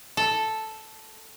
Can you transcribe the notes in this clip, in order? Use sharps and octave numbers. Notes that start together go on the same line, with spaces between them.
A4